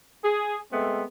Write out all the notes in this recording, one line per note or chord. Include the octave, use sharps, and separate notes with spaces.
G#4
G#3 A3 B3 C4